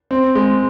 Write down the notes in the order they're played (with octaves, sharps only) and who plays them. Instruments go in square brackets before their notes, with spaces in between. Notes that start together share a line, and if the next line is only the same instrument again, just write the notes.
[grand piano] C4
G#3